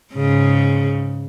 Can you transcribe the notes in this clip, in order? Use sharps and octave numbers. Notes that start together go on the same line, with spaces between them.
G#2 C#3